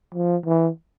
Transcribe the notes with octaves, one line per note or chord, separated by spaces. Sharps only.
F3
E3